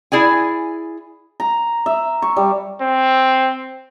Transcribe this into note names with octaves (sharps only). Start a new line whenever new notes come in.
E4 G#4 D5 G#5
A#5
E5
C#6
G3
C4